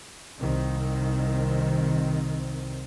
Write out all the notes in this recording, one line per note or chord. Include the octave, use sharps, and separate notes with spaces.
C2 D#3 C4